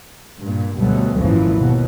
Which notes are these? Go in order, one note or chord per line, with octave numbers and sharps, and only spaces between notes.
G2 A#2
D2 B2 F#3 G3 A3
G#1 F#2 A#2 E3 F3
D#2 B2